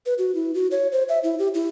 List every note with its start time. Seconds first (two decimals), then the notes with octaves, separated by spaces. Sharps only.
0.06 B4
0.18 F#4
0.35 E4
0.55 F#4
0.71 C#5
0.92 C5
1.09 E5
1.24 E4
1.39 G4
1.54 E4